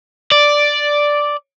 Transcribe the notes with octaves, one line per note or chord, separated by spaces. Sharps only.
D5